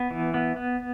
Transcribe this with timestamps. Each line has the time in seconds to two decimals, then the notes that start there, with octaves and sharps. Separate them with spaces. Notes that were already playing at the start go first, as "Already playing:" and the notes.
Already playing: B3
0.11 E3
0.34 B3
0.56 B3